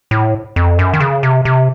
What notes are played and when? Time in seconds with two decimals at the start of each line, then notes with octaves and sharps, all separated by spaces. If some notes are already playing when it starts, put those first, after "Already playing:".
0.11 A2
0.56 F2
0.79 F#2
0.94 D#3
1.00 C#3
1.23 C3
1.45 C3